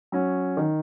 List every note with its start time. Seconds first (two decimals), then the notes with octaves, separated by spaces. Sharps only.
0.12 F#3 C#4
0.57 D#3